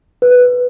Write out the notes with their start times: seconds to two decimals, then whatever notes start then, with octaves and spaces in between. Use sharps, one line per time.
0.22 B4